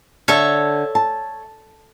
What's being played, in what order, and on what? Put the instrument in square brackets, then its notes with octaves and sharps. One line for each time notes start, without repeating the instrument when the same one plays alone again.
[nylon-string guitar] D3 [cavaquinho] A4 C#5 E5
[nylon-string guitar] A5